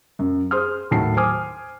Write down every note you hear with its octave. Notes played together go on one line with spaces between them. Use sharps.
F#2
G#4 C5 C6 D#6 F6
D#2 A2 F#3 A5 C7
C5 G#5 D6 D#6 F6